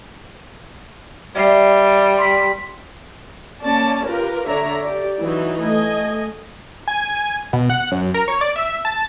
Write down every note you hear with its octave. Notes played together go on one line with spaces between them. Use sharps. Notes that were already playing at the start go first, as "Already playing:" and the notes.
G3 D5 E5 C7
C6 B6
A#3 C#4 D5 A5
F4 G4 A#4 B4
D3 C#5 D5 E5 A#5
G4 D5
E3 F#3 D#4
A3 D#5 G#5
G#5
B2
F#5
F#2
A#4
C#5
D5
E5
A5